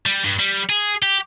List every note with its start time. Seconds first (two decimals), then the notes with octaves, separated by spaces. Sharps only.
0.06 G3
0.24 G2
0.39 G3
0.69 G#4
1.02 G4